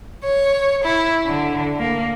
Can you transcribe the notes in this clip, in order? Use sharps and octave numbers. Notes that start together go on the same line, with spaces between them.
C#5
E4
D3
A#3